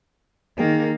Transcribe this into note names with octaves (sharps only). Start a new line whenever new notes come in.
D#3 A#3 D#4 G#4 G5